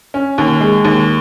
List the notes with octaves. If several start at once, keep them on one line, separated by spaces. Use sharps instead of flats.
C#4
D#2
G#3
D#2